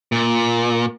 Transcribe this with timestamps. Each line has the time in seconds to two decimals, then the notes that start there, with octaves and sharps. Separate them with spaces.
0.12 A#2